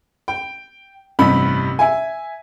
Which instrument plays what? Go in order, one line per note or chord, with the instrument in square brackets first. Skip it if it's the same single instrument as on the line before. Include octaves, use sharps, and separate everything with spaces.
[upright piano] G5
A1 G2 C3 B5
E5 G#5